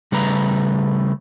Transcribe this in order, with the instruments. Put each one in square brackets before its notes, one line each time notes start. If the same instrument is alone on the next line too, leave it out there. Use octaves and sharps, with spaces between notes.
[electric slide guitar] C#3 G3 A3 B4 A#5